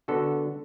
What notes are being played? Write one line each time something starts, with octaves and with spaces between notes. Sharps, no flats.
D3 B3 F#4 A4